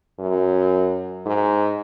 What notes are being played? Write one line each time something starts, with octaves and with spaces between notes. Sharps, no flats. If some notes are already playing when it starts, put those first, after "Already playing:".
F#2
G#2